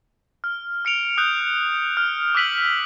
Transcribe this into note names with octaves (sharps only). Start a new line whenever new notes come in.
F6
F6 C#7 D7 F7
D#6 F#6 G6 C#7
F6
D6 E6 F#6 B6 D#7 F#7